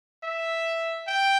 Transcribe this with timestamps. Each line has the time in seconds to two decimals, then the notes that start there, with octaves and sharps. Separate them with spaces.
0.23 E5
1.07 G5